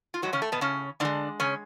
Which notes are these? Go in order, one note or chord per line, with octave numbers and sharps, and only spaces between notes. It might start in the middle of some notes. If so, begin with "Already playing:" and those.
F4
A2 F#3 G#3 F#4
C#3 C#4
A3
B2 B3
C#3 C#4
A2 D3 G#3 D4
C#3 C#4